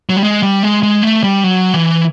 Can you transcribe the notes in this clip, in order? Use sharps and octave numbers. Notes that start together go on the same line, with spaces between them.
F#3
G3
G#3
G3
G#3
G#3
A3
G3
F#3
E3